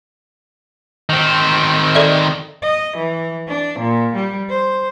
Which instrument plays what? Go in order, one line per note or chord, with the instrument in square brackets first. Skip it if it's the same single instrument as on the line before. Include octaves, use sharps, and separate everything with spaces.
[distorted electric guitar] D#3 C4
[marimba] A4 D5 E5
[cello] D#5
E3
D4
A#2
G3
C5